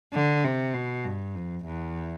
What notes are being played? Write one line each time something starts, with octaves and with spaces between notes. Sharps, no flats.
D3
C3
B2
G2
F2
E2